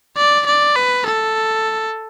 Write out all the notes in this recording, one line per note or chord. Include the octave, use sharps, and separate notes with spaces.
D5
D5
B4
A4